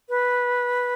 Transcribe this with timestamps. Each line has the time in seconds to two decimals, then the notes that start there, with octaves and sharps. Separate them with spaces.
0.09 B4